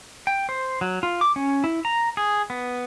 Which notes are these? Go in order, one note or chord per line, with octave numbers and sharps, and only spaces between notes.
G5
C5
F#3
F4
D6
C#4
E4
A#5
G#4
B3